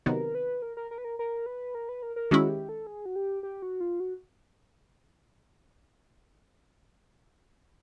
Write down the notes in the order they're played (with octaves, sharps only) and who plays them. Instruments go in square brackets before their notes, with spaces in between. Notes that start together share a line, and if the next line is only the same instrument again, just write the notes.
[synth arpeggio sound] C3 D#3 F#3 B3 [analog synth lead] A#4
[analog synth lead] B4
A#4
A#4
A#4
B4
A#4
A#4
B4
A#4
B4
A#4
A#4
[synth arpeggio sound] D#3 G#3 C#4 E4 [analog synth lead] F#4
[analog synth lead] G4
A4
G#4
F#4
G4
G4
F#4
F4
F#4